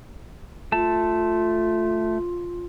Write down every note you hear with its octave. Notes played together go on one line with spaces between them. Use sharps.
A3 F4 A5